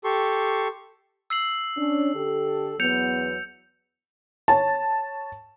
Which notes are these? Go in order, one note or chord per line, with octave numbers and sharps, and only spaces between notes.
G4 A4 C6 C#6
E6 C7 F#7
C#4 D4
D3 G4 A4
E2 F#3 B3 G6 C#7 F7
C#5 A5